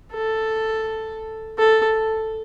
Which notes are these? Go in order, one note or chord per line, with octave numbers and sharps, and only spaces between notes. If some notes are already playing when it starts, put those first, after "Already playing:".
A4
A4